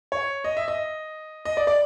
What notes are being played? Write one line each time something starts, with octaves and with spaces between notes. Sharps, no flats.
C#5
D#5
E5
D#5
D#5
D5
D5